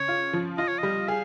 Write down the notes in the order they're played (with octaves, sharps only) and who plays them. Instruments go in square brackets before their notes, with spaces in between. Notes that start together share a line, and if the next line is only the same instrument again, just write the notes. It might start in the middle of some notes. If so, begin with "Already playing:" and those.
Already playing: [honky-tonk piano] C#3 [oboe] C#5
[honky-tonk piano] F4
F3
[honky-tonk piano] F4 [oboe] D#5
[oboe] C#5
[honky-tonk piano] G3 [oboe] D#5
[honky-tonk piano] G#4 [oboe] F5